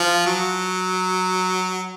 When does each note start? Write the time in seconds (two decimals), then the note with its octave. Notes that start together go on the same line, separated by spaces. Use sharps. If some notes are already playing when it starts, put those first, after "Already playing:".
Already playing: F3
0.26 F#3